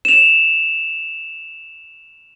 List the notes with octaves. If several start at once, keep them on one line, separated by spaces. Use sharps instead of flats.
E7 F7